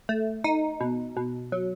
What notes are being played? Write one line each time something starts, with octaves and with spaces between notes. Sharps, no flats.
A3
D#4
B2
B2
F#3